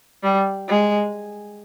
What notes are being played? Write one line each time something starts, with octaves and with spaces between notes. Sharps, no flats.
G3
G#3